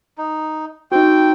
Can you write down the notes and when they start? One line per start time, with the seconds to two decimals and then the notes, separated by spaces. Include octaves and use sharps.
0.18 D#4
0.92 C4 D#4 F#4 G5